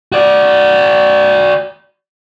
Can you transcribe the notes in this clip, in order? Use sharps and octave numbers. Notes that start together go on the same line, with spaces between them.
F#4 D5